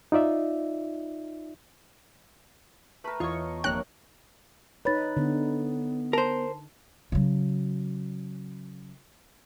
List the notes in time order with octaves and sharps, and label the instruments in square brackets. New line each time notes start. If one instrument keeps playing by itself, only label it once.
[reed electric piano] D#4 F4 D5 E5
[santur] A3 A#4 [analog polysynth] B4
[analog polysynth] E2 E3 C#6 [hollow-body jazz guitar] F4 C#5 [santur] D#5
[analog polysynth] G1 A#3 A#4 [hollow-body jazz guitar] F2 D4 G5 [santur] C#5 [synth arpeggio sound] F#6
[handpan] D#4 B4 [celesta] C#5 B5 A6
[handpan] D3 [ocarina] B3
[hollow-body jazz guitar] A#4 C5 [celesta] A5
[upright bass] C#3 F#3